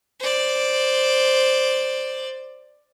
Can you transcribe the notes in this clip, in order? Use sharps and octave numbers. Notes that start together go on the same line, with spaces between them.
C5 D5